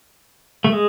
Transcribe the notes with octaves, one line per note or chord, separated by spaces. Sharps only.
A3
G#3